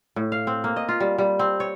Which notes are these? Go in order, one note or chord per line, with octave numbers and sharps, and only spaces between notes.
A2
F5
C4
A#3
D#5
F4
G3
G3
C4
C#5